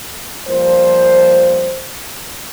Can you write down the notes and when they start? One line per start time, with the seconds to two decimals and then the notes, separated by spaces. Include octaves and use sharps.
0.48 F3 G3 A#3 C5